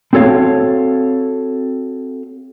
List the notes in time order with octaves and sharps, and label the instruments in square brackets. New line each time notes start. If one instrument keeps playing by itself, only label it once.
[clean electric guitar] C4 F#4 A4 C#5 F5